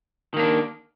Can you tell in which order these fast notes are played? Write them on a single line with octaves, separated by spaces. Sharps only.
D#3 A#3 D4